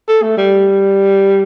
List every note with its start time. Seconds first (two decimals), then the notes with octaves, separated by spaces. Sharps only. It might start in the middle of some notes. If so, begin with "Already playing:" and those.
0.08 A4
0.22 A3
0.37 G3